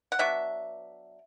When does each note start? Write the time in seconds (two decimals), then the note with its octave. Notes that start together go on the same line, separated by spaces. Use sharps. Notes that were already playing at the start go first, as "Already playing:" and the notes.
0.12 F#5
0.19 F#3 B3 D4 E5